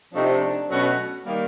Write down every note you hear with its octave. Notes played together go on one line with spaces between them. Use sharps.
C3 F3 A3 C4 D4 D#4
B2 F#3 A3 C#4 F#4
D#3 G3 A#3